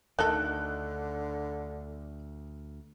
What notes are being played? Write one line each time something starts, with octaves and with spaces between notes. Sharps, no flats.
D2 D3 D#3 D#4 A4 F#6